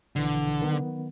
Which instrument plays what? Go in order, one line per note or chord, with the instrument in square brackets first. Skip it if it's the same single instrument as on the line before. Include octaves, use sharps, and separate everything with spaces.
[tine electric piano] A#1 B2 E3 [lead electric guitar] D3
[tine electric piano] D#3 F#3 B3